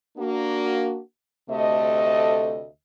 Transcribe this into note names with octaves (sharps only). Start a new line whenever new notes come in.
A#3 D4 F#4
D2 C3 A3 A4 D#5